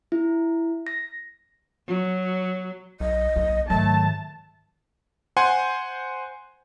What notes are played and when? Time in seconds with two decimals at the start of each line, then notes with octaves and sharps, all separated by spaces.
0.12 E4
0.87 A#6
1.87 F#3
3.00 B1 D#5
3.36 B1 A#3
3.70 G#2 D#3 F#3 A3 A5
5.37 C5 F#5 G#5 C6